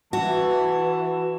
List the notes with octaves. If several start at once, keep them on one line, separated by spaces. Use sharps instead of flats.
E3 F#4 A5